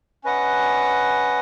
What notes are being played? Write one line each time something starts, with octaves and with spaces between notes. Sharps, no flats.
C#4 B4 D#5 F#5